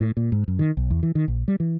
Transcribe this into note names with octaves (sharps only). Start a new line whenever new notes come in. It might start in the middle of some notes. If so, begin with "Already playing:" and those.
A2
A#2
G#2
F#2
D#3
B1
E2
E3
D#3
A#1
G3
E3